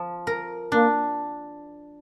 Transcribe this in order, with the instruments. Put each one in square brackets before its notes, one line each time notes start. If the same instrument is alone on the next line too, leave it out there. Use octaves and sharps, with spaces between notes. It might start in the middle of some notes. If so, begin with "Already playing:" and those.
Already playing: [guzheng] F3
A#4
[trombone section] A#3 [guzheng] D4